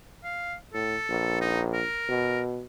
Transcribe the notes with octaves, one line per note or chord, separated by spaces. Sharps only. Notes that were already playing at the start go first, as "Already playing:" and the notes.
F5
A2 A4
A#1
D#4
A#4
B2